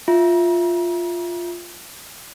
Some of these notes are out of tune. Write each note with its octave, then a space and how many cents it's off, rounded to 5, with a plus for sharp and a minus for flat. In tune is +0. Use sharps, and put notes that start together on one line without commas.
F4 +0 E5 +0 A#5 +40